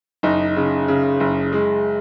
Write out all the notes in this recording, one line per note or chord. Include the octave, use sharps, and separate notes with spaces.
F#1 D#4
C#3
C#3
F#1
G#3